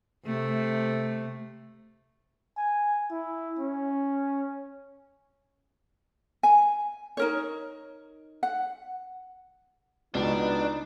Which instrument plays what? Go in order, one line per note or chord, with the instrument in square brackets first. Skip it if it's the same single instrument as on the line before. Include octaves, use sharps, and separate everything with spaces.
[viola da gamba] C3 A3
[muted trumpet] G#5
E4
C#4
[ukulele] G#5
D#4 A#4 C#5
F#5
[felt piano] C#2 [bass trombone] B2 [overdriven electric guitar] D4 [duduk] D#4